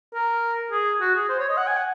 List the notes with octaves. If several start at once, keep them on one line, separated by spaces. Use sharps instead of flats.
A#4
G#4
F#4
G#4
C5
C#5
D#5
F#5
G#5
F#5